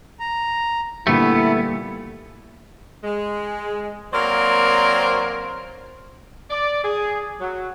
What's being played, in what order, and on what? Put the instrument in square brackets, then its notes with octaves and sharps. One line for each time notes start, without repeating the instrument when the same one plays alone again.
[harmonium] A#5
[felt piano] A#2 D3 G3 [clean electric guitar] A3 B3 [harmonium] E4
[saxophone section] G#3
F#3 A#3 C4 A#4 C5 D5
[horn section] D5
G#4
F#3